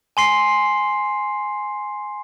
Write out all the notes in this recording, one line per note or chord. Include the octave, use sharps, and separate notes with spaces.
G#5 C6 C7